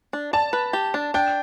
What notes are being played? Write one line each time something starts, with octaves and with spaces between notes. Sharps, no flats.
D4
D5 A5
B4
G4
D4
D4 G5